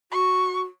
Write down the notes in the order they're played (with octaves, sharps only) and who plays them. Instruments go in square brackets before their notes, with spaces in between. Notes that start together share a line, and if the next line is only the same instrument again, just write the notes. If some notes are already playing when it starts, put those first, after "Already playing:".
[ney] F#4 [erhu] C#6